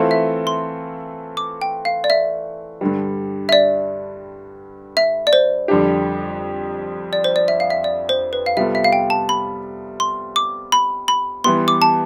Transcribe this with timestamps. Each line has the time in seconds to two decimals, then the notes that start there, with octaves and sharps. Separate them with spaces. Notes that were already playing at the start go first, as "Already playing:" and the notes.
Already playing: E3 A3 C4 F4 A4
0.11 E5
0.47 C6
1.37 D6
1.62 G5
1.85 F5
2.04 D5
2.10 E5
2.81 G2 D3 G3
3.49 E5
3.53 D5
4.97 E5
5.27 D5
5.33 C5
5.68 F2 D3 G3 D4 G4
7.13 D5
7.24 C5
7.36 D5
7.48 E5
7.60 F5
7.70 E5
7.84 D5
8.09 C5
8.33 B4
8.46 F5
8.57 C3 G3 B3 F4 A4 E5
8.75 E5
8.84 F5
8.93 G5
9.10 A5
9.29 B5
10.00 C6
10.36 D6
10.72 B5
11.08 B5
11.44 E3 G3 B3 C6
11.68 D6
11.82 A5